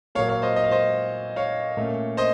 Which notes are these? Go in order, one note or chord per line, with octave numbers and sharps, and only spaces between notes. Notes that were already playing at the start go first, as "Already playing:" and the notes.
A#2 F#3 A#3 C#5 F5
C#5 F5
C5 D#5
D#5
F5
C5 D#5
C#5 F5
A#2 A3 C#4
C5 D#5